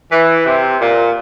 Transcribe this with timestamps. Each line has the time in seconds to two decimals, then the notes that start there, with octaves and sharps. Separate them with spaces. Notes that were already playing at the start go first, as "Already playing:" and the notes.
0.11 E3
0.46 C3
0.80 A#2